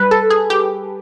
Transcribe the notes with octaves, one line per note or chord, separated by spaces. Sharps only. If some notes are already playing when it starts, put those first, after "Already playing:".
Already playing: G3 B4
A4
G#4
G4